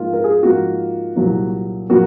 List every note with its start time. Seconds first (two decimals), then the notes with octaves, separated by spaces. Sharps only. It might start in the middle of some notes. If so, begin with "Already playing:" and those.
Already playing: G#2 F3 A#3 F4
0.13 A#4
0.24 G#4
0.43 G#2 F3 A#3 F4 F#4
1.16 C2 A#2 F#3 A#3
1.89 A#2 F#3 A#3 F#4